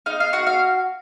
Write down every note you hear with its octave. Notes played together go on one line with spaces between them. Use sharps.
D#4 F5
F5
F#4 F#5
F5